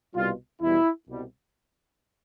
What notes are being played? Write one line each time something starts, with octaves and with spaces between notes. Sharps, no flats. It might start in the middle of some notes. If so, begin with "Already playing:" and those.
C2 B2 G3 F4
E2 B2 G3 E4
C2 B2 G3